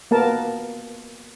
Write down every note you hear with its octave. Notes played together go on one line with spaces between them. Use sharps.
A#3 B3 A#4 A5